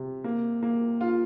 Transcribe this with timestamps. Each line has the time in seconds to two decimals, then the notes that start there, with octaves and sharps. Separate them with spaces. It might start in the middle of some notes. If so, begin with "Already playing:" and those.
Already playing: C3
0.24 A#3
0.63 A#3
1.01 F4